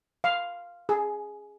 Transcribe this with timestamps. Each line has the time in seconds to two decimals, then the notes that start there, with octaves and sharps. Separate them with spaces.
0.24 F5
0.89 G#4